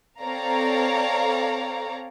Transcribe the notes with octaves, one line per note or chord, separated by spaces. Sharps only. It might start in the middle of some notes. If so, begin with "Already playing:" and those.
C4 A4 C#5 D5 F5 A#5